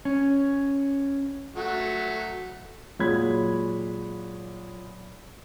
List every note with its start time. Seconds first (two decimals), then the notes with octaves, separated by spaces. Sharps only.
0.05 C#4
1.56 F#3 A3 F#4
2.99 A#2 F#3 G#3 C#5 B5 G#6